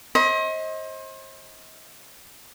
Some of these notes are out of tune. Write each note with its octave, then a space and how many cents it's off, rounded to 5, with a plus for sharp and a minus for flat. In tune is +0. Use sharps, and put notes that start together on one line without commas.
C5 +35 D#5 +30 B5 +0